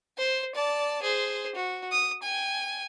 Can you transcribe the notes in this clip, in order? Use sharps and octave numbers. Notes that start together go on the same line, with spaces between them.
C5
D5 A5
G#4 C5
F#4
D#6
G5 G#5